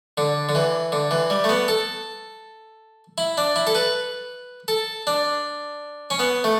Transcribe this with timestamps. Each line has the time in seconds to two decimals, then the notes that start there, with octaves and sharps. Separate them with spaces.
0.18 D3
0.49 D3
0.55 E3
0.92 D3
1.11 E3
1.30 G3
1.44 A3
1.49 B3
1.68 A4
3.18 E4
3.38 D4
3.56 E4
3.67 A4
3.75 B4
4.68 A4
5.07 D4
6.10 C#4
6.19 B3
6.44 A3